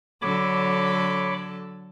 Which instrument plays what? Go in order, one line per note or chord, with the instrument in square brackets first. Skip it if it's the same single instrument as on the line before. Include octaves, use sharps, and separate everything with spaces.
[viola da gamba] D3 F#3 A4 [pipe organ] C#5 B5 D6